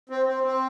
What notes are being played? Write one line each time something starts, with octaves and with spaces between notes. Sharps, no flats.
C4
C4
C4